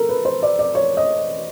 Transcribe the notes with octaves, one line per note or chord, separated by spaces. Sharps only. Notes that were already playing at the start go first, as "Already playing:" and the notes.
Already playing: A4 A#4
B4
C5
D5
D5
C#5
D#5